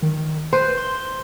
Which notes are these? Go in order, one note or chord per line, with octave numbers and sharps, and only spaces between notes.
D#3
B4 C5
C6